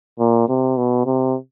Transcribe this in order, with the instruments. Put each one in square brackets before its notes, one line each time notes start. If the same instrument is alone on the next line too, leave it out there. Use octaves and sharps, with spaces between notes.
[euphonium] A#2
C3
B2
C3